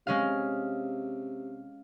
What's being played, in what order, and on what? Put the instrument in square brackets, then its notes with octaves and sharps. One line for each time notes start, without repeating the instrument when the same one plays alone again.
[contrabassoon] C3 [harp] G#3 C#4 F5